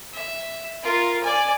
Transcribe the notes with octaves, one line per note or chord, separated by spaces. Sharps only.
E5
F4 A#4
D5 G#5